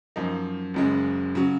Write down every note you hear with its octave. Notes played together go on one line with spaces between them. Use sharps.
F#2 F3 A#3 D#4
F#1 F#2 C#3 G#3
C#3 F#3